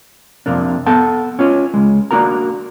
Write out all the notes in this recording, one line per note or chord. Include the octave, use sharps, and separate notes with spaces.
F2 C3 A#3 D4
B3 A4 F#5 A5
C#4 F4 C#5
C#2 G#3
A#3 D4 F#4 A#4 A#5